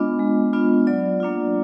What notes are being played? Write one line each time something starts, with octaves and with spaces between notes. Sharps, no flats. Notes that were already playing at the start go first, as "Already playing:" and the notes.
Already playing: G#3 B3 D4 F4 D#5
G#3
B3 D4 F4
F#3 D5
A#3 D4 F4